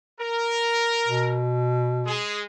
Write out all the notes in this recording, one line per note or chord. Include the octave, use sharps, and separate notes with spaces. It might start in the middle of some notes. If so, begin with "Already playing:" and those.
A#4
B2
G#3 G#4